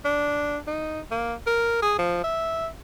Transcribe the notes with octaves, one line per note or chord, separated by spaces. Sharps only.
D4
D#4
A#3
A#4
G#4
F3
E5